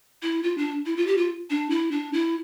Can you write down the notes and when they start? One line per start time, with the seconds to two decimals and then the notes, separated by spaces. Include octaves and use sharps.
0.22 E4
0.43 F4
0.58 D4
0.86 E4
0.97 F4
1.07 G4
1.18 F4
1.50 D4
1.70 E4
1.91 D4
2.13 E4